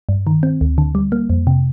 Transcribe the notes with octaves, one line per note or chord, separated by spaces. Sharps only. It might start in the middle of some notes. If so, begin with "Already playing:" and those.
G2
D#3
C4
D2
D3
G3
A#3
F2
C3